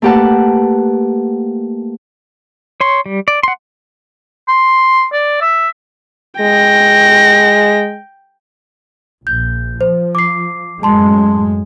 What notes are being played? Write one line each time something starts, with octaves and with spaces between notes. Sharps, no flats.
A3 A#3 G4 B4 F#5 A5
C#5 C6
G3
D5
F#5 C6
C6
D5
E5
G#3 G5 A#6
A#1 G6
F3 C5
D6 C7
F#2 A2 G#3 A5 C6